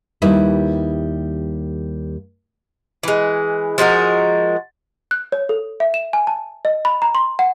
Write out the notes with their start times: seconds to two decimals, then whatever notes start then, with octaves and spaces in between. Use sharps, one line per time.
0.22 D#2 G3 D#4 E4 B4
3.03 E3 G#3
3.78 F3 G#3 F#4 A#4
5.11 F#6
5.32 C#5
5.49 A4
5.80 E5
5.94 E7
6.13 G#5
6.27 A5
6.65 D#5
6.85 B5
7.02 A#5
7.15 C6
7.39 F#5